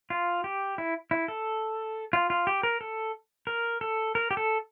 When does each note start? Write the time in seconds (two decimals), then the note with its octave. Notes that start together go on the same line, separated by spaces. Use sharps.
0.10 F4
0.44 G4
0.78 E4
1.11 E4
1.28 A4
2.13 F4
2.30 F4
2.47 G4
2.63 A#4
2.81 A4
3.47 A#4
3.81 A4
4.15 A#4
4.31 G4
4.37 A4